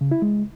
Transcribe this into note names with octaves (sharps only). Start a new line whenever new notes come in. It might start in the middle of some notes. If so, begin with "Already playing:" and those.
C#3
E4
G#3